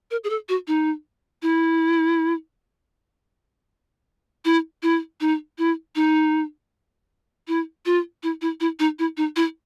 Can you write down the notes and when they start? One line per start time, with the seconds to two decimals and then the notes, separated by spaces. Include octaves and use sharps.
0.11 A#4
0.24 G#4
0.30 A4
0.49 F#4
0.68 D#4
1.42 E4
4.45 E4
4.83 E4
5.21 D#4
5.58 E4
5.96 D#4
7.48 E4
7.86 F4
8.23 E4
8.42 E4
8.60 E4
8.80 D#4
8.99 E4
9.17 D#4
9.36 E4